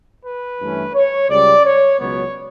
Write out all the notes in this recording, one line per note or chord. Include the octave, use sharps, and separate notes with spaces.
B4
G2 E3 A3 C#4
C#5
C#2 C#3 G3 C#4 D5
C#5
C#2 B2 F#3 B3 C#5